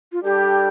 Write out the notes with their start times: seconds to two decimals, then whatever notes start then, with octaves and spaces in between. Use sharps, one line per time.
0.12 F4
0.23 G3 D4 G4 A4 D5 G5